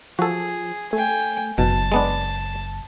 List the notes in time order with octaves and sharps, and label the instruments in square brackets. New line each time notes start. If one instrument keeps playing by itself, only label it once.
[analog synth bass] F3 [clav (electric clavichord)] F#4 A4 [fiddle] G#4
[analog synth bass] A3 [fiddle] G5 G#5
[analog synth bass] F#1 [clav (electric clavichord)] B2 [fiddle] A5
[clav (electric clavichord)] G#3 B3 D4